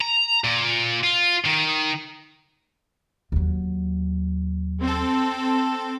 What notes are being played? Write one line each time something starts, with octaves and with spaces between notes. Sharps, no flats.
A#5
A#2
F4
D#3
D#2 F#3
C4 A4